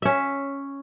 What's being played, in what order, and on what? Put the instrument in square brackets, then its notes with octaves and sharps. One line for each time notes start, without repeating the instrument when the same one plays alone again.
[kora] C#4 E5